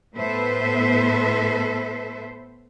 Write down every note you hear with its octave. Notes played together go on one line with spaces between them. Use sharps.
A2 B3 A4 B4 C5 E5